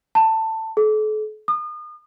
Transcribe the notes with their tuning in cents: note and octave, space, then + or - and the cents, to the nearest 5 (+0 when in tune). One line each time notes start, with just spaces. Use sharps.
A5 +15
A4 -40
D#6 -35